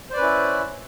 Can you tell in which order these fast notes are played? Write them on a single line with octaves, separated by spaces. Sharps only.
C5 D5 B4 C#4 E4